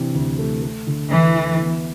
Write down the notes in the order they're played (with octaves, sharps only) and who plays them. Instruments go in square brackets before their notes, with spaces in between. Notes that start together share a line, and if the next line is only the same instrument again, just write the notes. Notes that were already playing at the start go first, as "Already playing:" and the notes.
Already playing: [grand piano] C3 E3 D4
D2
A3
A3
D3
[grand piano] D2 [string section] E3
[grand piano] E4
B3